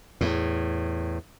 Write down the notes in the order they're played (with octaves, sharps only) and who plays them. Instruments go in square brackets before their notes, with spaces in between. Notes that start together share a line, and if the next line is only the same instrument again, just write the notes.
[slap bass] E2 A2